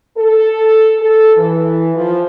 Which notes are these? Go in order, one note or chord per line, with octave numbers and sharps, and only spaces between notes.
A4
A4
E3
F3